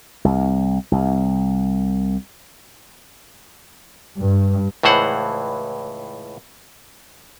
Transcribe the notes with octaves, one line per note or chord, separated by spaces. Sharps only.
C2
C2
G2
C#2 A2 E3 C5 F#5